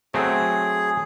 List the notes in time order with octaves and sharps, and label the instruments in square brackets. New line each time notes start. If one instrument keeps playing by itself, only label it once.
[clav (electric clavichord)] F#3 A3 C4 [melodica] G#4